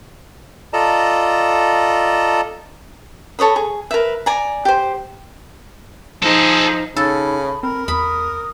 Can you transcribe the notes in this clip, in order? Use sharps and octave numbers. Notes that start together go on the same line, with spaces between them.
F4 A4 D5 D#5 A5 A#5
A4 C#5 D#5 B5
G#4
A#4 B4 E5
D5 G#5 A#5
G4 C5
F3 D#4 G#4 A4
C#3 D#4 A4 B5
C4 A#4 B5
E2 B5 D#6